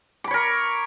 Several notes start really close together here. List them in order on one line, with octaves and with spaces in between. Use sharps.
D6 B5 C#5 A#4